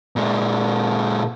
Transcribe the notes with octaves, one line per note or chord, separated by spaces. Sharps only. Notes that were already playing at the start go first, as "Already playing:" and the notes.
A#2 G#3